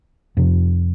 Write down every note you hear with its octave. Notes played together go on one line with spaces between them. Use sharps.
F2 C3 F3